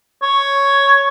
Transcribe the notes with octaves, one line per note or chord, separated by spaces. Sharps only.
C#5